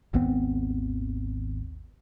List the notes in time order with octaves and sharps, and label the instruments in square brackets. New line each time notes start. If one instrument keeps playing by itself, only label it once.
[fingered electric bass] G#1 D#2 B3 C4